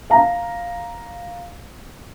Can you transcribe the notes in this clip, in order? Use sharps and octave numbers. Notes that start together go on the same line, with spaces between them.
F5 A#5